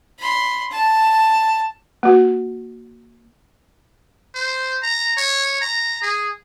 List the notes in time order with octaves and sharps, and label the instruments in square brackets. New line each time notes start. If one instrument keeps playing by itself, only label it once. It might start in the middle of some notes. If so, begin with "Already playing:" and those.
[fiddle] B5 C6
A5
[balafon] A#3 F#4
[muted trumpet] C5
A#5
C#5
A#5
G#4